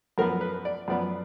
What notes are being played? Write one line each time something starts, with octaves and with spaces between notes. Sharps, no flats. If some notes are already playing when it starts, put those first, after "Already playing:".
F#2 F3 B3 A#4
B4
D5
F#2 F3 B3 D5